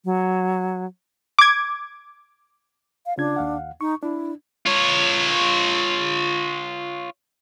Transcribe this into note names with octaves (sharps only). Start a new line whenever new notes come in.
F#3
D6 G#6
F5
C#3 D4 F4 G#6
D#2 F5 F#5
D#4 C#6
D4 E4
F4 C#5